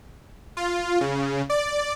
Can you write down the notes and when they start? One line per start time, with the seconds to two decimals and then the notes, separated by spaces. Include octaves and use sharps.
0.57 F4
1.01 C#3
1.50 D5